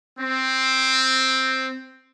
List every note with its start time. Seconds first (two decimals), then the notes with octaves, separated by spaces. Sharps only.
0.19 C4